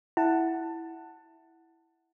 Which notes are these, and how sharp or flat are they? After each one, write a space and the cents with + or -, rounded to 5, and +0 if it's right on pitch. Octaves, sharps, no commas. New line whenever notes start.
E4 +0 F#5 +0 A5 +15